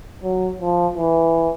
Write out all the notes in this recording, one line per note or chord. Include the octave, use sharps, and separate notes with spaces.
F#3
F3
E3